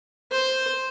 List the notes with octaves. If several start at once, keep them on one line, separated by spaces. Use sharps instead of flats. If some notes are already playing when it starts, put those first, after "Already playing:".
C5